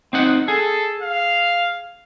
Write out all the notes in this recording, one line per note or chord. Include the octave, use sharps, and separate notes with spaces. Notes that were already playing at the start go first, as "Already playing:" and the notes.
C4 D#4 F#5
G#4 A4
F5